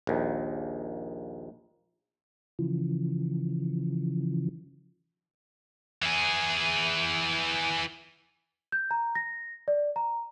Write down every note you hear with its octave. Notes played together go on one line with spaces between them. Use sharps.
A#1 D#2
C#3 E3 F3
E3 G#4
G6
A#5
A#6
D5
A#5